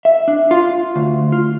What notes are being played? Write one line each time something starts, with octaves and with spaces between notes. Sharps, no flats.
E5
D4
F4
D2
F4